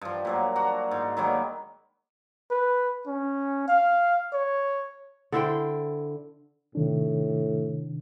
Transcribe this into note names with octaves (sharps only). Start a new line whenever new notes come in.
G2 F3
A#2 F#3 A#3
D4 F#4 A#5 D6
G#2 C6
D#3 F#3 G3 A#3
B4
C#4
F5
C#5
D3 E4 C5 G5
A2 C3 D#3 D4